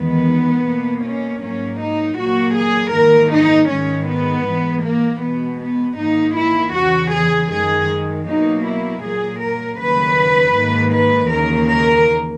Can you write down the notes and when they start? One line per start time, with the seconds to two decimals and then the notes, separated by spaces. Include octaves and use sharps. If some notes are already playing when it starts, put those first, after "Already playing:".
Already playing: E2 D#3 G#3 B3
0.65 B2 A#3
1.04 C#4
1.42 G#2 F#3 A#3 C#4
1.80 D#4
2.17 A#2 F#3 A#3 F#4
2.57 G#4
2.94 G#2 D#3 A#3 A#4
3.33 D#4
3.70 G#2 D#3 G#3 C#4
4.09 B3
4.46 G#2 E3 G#3
4.85 A#3
5.22 B2 G#3 B3
5.60 B3
5.99 G#2 D#3 A#3 D#4
6.36 E4
6.74 E2 C#3 E3 F#4
7.13 G#4
7.51 F#2 D#3 G#3 G#4
8.27 B2 F#3 A#3 D#4
8.66 E4
9.03 A#2 F#3 A#3 G#4
9.41 A#4
9.79 D#2 C#3 F#3 A#3 B4
10.55 G#2 D#3 A#3
10.93 B4
11.31 D#2 C#3 E3 A#3 A#4
11.69 A#4